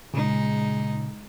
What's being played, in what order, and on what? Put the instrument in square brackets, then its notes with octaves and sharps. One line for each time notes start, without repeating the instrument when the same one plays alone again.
[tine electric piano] A#2 C#3 [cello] G#3 D#4